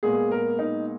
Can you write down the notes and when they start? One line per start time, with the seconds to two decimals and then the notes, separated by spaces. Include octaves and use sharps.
0.03 A#2 G#3 B3 G#4
0.31 A#4
0.59 D#4